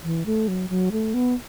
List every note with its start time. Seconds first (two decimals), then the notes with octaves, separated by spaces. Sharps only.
0.03 E3
0.26 A3
0.48 F#3
0.69 F#3
0.92 A3
1.14 B3